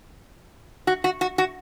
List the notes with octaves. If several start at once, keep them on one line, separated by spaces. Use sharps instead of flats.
F#4
F#4
F#4
F#4